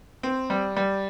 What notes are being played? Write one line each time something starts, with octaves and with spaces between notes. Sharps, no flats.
C4
G3
G3